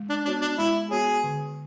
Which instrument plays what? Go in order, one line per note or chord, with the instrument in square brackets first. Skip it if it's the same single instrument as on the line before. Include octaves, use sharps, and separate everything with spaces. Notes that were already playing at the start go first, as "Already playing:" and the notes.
Already playing: [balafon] G#3
[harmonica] D4
[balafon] B3 F#4 C#5 [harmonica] D4
[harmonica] D4
[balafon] G#3 [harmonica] E4
[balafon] B3 F#4 C#5 [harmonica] G#4
[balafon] D3